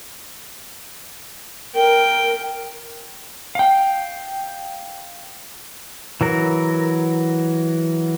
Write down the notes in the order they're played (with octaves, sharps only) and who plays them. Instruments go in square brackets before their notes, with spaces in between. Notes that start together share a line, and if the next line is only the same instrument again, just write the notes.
[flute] A#4 [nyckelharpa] G5
[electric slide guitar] F5 G5
[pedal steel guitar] E3 F#3 A#4